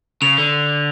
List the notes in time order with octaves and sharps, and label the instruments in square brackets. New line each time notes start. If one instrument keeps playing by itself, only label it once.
[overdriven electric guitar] C#3 [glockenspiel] F7
[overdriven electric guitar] D3